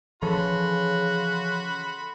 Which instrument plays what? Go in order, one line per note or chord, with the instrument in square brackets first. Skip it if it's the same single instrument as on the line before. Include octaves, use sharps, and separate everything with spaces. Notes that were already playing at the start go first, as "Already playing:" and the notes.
[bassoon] C#3 [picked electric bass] E3 F3 [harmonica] F#4 B5 C6 [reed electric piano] A4 C#5